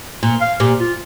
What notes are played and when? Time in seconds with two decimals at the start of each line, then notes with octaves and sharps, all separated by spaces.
0.23 A#2
0.41 F5
0.60 A#2 G4
0.80 F4